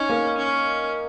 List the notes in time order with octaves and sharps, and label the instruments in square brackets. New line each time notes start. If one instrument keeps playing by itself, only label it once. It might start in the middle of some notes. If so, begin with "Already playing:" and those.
Already playing: [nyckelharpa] C#4 [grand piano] D#4
[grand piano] A#3
[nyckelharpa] C#4